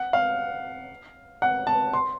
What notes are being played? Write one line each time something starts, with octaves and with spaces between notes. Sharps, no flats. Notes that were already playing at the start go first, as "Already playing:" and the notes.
Already playing: F#5
F5
F#5
A5
C6